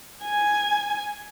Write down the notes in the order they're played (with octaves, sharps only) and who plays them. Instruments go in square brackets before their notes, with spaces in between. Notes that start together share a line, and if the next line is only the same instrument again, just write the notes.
[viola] G#5